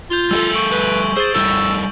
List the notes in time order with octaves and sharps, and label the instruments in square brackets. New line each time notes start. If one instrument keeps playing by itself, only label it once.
[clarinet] F4 [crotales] G6 F7 G7
[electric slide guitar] G3 G#4 A4 [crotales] E6
[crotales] C#6 D7 F#7
[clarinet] B4 [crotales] G6
[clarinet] G#4 [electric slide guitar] C5 [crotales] E6 A6
[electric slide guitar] G3 E4 A4 [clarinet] E6 [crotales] G6